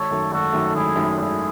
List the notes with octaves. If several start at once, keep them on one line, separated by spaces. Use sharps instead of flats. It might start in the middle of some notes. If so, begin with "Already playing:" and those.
Already playing: G#1 A4 C#5
F#2 D#3 A3
G#1 F#4 A4
F#2 D#3 A3
G#1 E4 G#4
F#2 D#3 A3
G#1 E4 G#4